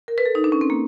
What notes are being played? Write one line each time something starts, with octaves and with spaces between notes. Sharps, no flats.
A#4
B4
A4
D#4
D4
C#4
C4
A#3